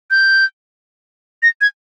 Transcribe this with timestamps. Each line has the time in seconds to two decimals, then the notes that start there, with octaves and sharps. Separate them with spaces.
0.11 G6
1.43 A#6
1.61 G#6